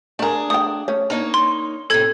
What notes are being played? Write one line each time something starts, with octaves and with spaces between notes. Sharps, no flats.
A3 D4 G#4 A#4
A3 G5 D#6
A3 C#4 C#5
A#3 D4 D#4 C#5
C6
A2 C3 A4 G#6